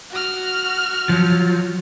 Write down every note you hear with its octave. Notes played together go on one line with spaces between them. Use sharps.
F#4 F6
F3 F#3